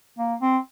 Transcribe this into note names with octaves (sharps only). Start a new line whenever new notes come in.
A#3
C4